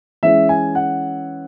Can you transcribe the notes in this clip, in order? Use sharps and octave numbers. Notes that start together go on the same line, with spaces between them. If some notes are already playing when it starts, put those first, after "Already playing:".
E3 G#3 C#4 E5
G#5
F#5